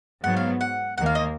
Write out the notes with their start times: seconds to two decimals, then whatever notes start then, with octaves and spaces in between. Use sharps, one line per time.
0.24 G#2 F#3 B3 F#5
0.37 F5
0.61 F#5
0.98 D#2 D#3 A#3 F#5
1.06 F5
1.15 D#5